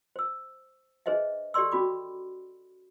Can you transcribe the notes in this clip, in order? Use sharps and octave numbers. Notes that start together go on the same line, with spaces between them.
C5 E6
D4 G#4 B4 C5 D#5 E5
G4 A4 D5 C6 E6
C#4 F#4 B5 D6